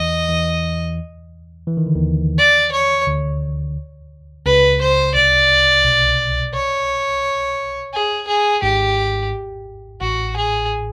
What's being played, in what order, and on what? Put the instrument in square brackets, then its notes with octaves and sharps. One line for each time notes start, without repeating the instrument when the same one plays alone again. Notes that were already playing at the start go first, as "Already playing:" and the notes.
Already playing: [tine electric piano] E2 E3 [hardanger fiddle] D#5
[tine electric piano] E2 E3
E3
D#3
D3
D#2 D#3
[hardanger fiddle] D5
C#5
[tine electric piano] D2 D3
[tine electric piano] C#2 C#3 [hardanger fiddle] B4
[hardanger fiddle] C5
[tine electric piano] C2 C3 [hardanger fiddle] D5
[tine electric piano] B1 B2
[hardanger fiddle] C#5
G#4
G#4
[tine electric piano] G#1 G#2 [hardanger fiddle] G4
[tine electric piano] A1 A2 [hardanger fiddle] F#4
[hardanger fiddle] G#4